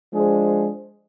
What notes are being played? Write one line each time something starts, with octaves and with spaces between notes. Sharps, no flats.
F3 G#3 D4 G#4 C5